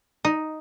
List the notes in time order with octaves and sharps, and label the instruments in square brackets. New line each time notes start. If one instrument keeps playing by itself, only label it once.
[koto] D#4